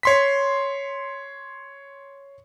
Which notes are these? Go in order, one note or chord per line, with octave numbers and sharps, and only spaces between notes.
C#5 C6 B6